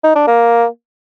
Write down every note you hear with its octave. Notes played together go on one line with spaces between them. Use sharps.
D#4
D4
A#3